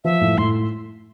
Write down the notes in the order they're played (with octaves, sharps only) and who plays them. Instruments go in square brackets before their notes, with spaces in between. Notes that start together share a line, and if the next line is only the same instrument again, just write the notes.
[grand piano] F3 [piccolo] E5
[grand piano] A2
[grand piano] A2 [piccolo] C6